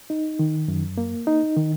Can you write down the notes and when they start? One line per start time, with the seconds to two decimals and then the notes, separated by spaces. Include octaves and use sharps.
0.10 D#4
0.39 D#3
0.68 F#2
0.98 A#3
1.27 D#4
1.57 D#3